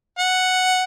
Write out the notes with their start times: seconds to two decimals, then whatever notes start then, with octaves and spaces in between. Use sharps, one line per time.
0.18 F#5